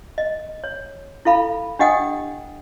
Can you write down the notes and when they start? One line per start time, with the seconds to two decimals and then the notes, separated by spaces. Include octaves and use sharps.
0.18 D#5
0.64 C#5
1.25 E4 A4 F5 B5
1.79 D4 G4 D#5 F#5 G5 D#6